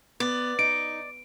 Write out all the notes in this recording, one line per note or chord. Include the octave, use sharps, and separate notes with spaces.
B3 D5
D#4 D7